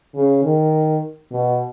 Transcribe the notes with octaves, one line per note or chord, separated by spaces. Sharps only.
C#3
D#3
B2